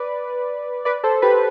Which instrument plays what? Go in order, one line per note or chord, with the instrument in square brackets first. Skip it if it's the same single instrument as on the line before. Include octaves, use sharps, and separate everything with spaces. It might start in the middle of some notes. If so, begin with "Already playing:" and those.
Already playing: [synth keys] B4 D5
B4 D5
A4 C5
G4 B4